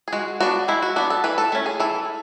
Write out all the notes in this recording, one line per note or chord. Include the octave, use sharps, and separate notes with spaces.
G#4
G#3 F#4
B3 D4 F#4
G#3 E4
F#4
B3 D4 F#4
A4
E3 B4
A4
A3 C#4
G#4
E3 A4